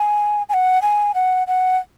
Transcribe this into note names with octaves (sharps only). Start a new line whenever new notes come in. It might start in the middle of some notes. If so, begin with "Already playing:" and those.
Already playing: G#5
G#5
F#5
G#5
F#5
F#5